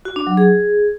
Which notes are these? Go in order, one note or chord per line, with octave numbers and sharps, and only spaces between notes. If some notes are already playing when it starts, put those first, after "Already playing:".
F#4
D4
F#3
G#4